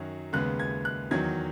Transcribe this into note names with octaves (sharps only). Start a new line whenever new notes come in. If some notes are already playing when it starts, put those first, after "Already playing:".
Already playing: F#2 D#3 F#3 C#4
D#2 C#3 G#3 B3 F#6
G#6
F#6
E2 D#3 F#3 G#6